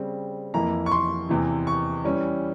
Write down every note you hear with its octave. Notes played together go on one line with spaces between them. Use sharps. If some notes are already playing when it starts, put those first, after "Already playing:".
Already playing: C#3 G3 C4
F2 E3 A#3 E4 A#5
C#6
C6
E2 C3 E3
C#6
E3 G3 C#4